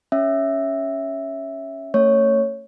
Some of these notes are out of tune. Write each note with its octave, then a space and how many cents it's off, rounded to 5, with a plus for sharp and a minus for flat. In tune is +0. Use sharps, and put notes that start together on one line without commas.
C#4 +0 E5 +0
A3 +35 C#4 +0 C#5 +0